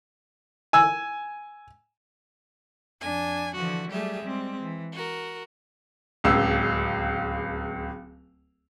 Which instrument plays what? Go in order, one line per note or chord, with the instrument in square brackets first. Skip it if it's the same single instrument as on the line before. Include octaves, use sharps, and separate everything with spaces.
[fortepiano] G#5 E6
[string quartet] F2 D4 G#5
D3 E3 F3 F#4
F#3 G3 A3 G4 G#4 E5
G3 G#3 C4
E3
F#4 A#4
[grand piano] D1 C#2 E6